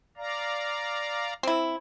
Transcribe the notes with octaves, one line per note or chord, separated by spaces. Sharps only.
D5 F5 A#5
C4 E4